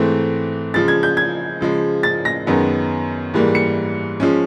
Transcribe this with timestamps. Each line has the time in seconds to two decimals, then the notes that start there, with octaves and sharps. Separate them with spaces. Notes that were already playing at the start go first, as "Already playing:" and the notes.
Already playing: G#2 E3 A3 C4
0.74 C#3 F3 G#3 A6
0.88 G#6
1.03 G6
1.17 G#6
1.61 C#3 F3 G#3
2.03 A6
2.25 A#6
2.47 F#2 D#3 G#3 B3
3.34 G#2 E3 G3 A#3
3.55 C#7
4.20 F3 G#3 C#4